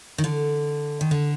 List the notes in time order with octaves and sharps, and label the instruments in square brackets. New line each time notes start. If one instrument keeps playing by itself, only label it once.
[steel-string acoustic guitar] D#3
D3
D#3
D3